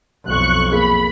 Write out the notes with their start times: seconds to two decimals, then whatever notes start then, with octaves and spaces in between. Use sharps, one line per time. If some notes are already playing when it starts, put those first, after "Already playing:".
0.24 B1 F2 C#6 F#6
0.71 A#3 G#4 A#4 B5